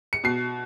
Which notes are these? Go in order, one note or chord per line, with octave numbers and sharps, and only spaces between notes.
C#7
B2 C7